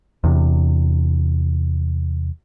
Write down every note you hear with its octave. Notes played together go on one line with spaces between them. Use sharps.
E2 C3